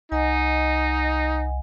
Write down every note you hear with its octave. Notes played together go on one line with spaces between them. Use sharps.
C2 D#4 D#5 F#5 G#5